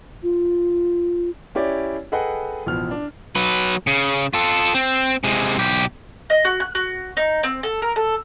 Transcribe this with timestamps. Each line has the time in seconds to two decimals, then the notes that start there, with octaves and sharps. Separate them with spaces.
0.23 F4
1.55 C#4 E4 G4 C#5 D5
2.12 G#4 A4 B4 D#5 F#5 G5
2.66 A1 B2 F3 F6
2.91 D4
3.36 F#3 B4
3.87 C#3
4.34 F4 A4
4.74 C4
5.24 C3 G#3
5.58 B1 G4
6.30 D#5
6.45 F#4
6.60 F#6
6.75 F#4
7.17 D#4
7.43 C4
7.63 A4
7.82 A#4
7.96 A4